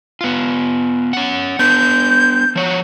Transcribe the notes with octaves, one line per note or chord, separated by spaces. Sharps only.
B3 F4
C#4 F#5
B3 D4 B4 G6
F3 C#5 F#5